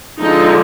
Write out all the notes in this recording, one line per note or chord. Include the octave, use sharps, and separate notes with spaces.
D3 F3 G#3 D#4